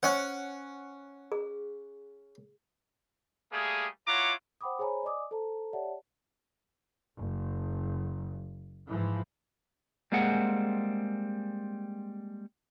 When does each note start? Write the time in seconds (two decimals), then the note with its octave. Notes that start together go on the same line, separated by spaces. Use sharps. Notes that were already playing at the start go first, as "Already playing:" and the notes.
0.03 C#4 C5 C#5 F#5
1.32 G#4
3.52 G3 A3 A#3 G#4
4.07 E4 F4 C#5 F#5 A#5 D6
4.61 C5 F#5 G5 B5 D6 D#6
4.79 G#4 C5 C#5 G#5 A#5 B5
5.03 D5 D#5 G#5 D6 D#6
5.31 A4 C5 A5 A#5
5.73 G4 C#5 D5 E5 F#5 A5
7.17 F#1
8.88 G#2 E3 F3
10.12 G3 G#3 A#3 C4 G#4 F#5